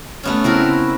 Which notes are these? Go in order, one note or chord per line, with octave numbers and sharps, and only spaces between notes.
A3 B3 C#4
C#3 B3 C4 E4 F#4 A#4